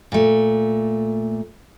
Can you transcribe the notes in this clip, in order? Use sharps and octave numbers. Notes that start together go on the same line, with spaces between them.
A#2 A3